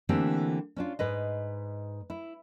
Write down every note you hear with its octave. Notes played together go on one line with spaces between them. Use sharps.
D3 E3 A3 A#3 C4 G4
C#4 D4 F4
G#2 B4 D#5
E4